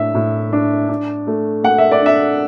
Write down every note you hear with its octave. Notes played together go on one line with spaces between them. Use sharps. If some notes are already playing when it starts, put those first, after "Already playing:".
Already playing: A2 D4 E5
A2
D4
D4
A3
A3 F#5
E5
D5
D4 E5